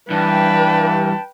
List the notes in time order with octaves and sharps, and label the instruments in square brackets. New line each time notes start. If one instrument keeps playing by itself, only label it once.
[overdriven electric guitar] G2 [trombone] E3 [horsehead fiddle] B4 G5 [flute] A5